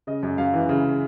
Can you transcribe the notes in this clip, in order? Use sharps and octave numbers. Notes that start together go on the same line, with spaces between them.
C#3 D#5
F#2
F#2 F5
E3
C#3